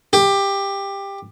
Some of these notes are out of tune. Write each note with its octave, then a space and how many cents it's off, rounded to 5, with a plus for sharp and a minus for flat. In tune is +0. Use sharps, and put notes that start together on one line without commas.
G4 +15